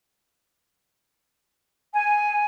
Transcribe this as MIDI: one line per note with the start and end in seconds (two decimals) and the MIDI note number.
1.92 2.44 80